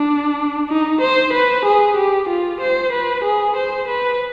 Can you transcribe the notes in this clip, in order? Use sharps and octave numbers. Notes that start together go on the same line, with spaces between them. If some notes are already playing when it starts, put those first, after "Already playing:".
Already playing: D4
D#4
C5
B4
G#4
G4
F4
C5
B4
G#4
C5
B4